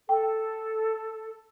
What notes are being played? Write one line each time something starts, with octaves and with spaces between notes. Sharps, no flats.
A4 G5